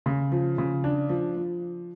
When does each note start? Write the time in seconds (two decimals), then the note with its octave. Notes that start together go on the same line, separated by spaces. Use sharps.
0.06 C#3
0.32 F3
0.58 C#3
0.84 D4
1.09 F3
1.36 F3